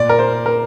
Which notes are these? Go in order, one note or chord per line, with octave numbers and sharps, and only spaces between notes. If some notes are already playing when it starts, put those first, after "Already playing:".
Already playing: A#2 D5
A#4
C5
A#4